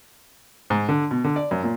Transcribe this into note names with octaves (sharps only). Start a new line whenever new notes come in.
G#2
D3
B2
D3
D5
F#2
A#2